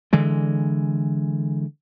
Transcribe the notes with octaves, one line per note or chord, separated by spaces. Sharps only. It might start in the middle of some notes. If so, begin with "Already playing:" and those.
D3 E3 G#3